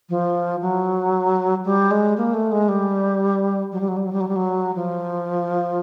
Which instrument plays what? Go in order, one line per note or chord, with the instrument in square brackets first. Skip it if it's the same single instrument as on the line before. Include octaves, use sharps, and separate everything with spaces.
[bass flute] F3
F#3
G3
G#3
A#3
A3
G#3
G3
F#3
G3
F#3
G3
F#3
G3
F#3
G3
F#3
F3